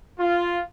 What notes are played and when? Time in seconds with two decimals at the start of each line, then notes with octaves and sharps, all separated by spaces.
0.19 F4